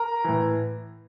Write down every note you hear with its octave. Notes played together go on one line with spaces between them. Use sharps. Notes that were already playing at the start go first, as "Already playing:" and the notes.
Already playing: A#4 A#5
A2 E3